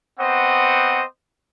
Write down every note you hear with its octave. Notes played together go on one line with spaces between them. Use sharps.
B3 C4 C5 D#5 F#5 C#6